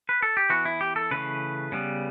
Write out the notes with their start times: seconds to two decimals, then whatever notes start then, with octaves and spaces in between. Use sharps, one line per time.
0.09 B4
0.22 A4
0.37 G4
0.50 E3 B3 F#4
0.65 E4
0.81 G4
0.96 A4
1.11 C#3 E3 A3 B4
1.72 C#3 G3 B3